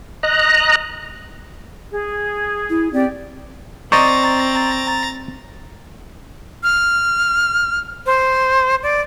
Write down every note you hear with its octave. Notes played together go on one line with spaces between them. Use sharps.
D#5 A#5 F#6
G#4
E4
C4 G4 D5
C4 C5 D5 D#5 A#5 C#6 A6
F6
C5
D5